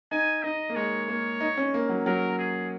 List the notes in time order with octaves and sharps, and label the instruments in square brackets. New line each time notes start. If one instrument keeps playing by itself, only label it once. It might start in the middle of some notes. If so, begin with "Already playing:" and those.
[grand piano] D#4 [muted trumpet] G#5
[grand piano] D#4 [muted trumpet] D#5
[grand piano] A#3
[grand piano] G#3 [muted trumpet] C#5
[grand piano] A#3
D#4
C#4
A#3
F#3
[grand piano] F#3 [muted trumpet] A#4
[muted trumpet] G#4